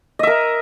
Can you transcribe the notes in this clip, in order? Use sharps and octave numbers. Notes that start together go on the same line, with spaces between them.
A#4 D#5 E5